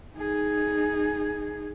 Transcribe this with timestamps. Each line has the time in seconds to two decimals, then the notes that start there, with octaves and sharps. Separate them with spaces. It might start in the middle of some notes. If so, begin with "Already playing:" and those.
0.16 D#4 G#4